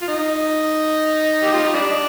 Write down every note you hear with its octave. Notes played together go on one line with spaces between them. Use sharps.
F4
D#4
G4
F4
D#4
G3 D4